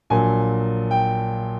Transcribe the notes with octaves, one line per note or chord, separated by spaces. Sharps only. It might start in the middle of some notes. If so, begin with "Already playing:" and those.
A#1 A#2 F#3 G#5
G5